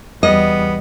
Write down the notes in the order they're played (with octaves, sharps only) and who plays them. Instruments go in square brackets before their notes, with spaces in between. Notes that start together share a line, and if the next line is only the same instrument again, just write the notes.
[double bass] E2 G3 [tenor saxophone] B3 [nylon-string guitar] D#5